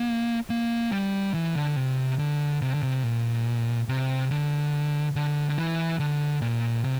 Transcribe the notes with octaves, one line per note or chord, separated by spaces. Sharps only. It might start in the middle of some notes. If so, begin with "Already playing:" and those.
Already playing: A#3
A#3
G3
E3
D3
C3
D3
C3
D3
C3
A#2
C3
D3
D3
D3
E3
D3
A#2
C3